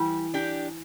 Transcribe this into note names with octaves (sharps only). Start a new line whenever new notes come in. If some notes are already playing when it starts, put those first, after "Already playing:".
Already playing: E3 G3
D4 G4